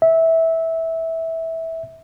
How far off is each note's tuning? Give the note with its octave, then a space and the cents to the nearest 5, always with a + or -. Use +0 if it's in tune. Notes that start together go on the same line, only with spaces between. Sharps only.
E5 -15